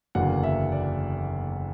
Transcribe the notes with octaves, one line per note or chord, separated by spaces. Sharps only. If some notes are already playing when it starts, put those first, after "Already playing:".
F#1 E2 D3 F#3 A#3 F#5
E5
D5